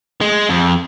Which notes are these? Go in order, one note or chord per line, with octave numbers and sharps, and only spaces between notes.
G#3
F2